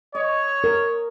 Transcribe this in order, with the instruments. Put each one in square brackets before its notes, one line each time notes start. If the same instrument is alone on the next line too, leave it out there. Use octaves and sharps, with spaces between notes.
[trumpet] C#5 [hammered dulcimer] D#5
[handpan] A#4